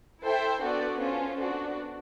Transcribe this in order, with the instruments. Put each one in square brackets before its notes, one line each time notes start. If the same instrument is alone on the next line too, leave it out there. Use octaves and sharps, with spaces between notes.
[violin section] E4 A4 C5 E5 G5
B3 D4 F#4 A4 D5
C#4 F4 A4 C5
B3 D4 F#4